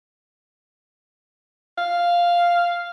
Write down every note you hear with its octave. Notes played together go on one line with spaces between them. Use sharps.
F5